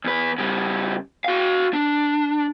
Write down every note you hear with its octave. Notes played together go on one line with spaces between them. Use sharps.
E2 B4
C#3 G3
F#4 F5
D4